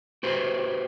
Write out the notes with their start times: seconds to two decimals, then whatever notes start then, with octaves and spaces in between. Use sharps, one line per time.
0.23 F#4 G4 B4 C5